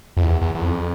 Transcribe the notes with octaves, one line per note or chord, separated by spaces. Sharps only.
F2
E2
E2
E2
F2